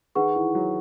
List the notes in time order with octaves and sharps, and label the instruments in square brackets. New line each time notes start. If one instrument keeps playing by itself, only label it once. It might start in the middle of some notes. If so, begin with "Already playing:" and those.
[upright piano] D#3 D#4 [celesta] G#4 B4 F#5 C#6
[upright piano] E3 E4
F#3 F#4